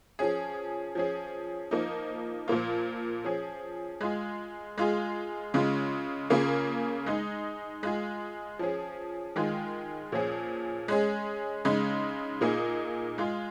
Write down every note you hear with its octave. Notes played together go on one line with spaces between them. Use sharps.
F3 C#4 G#4
F3 C#4 G#4
F3 A#3 D#4
A#2 F3 A#3 F4
F3 C#4 G#4
G#3 F4 G#4
G#3 F4 G#4
C#3 G#3 F4
C#3 A#3 F4 G#4
G#3 D#4 G#4
G#3 F4 G#4
F3 C#4 G#4
D#3 G#3 F4 G#4
A#2 F3 C#4 G#4
G#3 C#4 G#4
C#3 G#3 D#4
A#2 A#3 D#4 G#4
G#3 F4 G#4